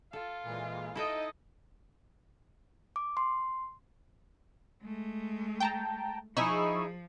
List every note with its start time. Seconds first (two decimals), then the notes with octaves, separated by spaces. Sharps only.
0.13 F4 A4
0.43 A#2 E3 G#3
0.95 D#4 E4 A4 D#5 G5
2.96 D6
3.17 C6
4.83 G#3 A3
5.60 G5 A5 A#5
6.37 F3 D#4 E4 G#4 B5 C#6 E6